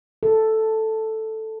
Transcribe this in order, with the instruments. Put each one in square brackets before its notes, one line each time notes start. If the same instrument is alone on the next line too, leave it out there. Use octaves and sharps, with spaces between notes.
[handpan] A4